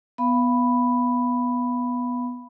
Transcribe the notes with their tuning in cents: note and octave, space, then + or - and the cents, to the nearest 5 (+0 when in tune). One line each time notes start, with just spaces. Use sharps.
B3 +0 F5 -20 B5 +0